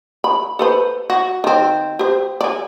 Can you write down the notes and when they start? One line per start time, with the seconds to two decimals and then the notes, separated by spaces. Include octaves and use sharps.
0.24 B5
0.59 A4 B4 C5
1.10 F#4
1.44 D#3 C4
1.99 G4 C5
2.41 D5 G#5